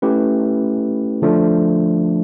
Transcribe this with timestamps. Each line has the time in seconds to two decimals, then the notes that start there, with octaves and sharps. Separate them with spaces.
0.02 A3 C#4 E4 G4 B4
1.22 D3 F3 A3 D4